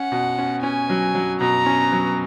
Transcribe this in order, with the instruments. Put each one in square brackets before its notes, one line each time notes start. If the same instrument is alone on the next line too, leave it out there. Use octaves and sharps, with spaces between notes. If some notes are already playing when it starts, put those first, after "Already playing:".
Already playing: [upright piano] C#4 [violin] F#5
[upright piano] B2
C#4
[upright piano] C#4 [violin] G#5
[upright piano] F#3
F#3
[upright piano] B2 [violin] A#5
[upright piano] C#4
F#3